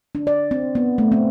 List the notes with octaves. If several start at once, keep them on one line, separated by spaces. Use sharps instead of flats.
D4
D5
C4
B3
A3
C4